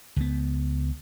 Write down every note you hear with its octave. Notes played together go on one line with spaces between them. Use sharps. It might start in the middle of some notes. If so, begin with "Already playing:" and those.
C#2 B3